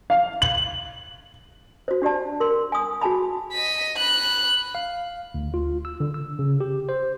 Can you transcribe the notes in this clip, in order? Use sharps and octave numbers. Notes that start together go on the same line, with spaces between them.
F5
F#7
F#4 C5
D4 G4 D5 A5
A#4 C6
G#5 D#6
F#4 G#4 G#5 A5 B5
D#5 B6
B5 F#6
F5
D2
F4
E6
D3
E6
C#3
G4
C5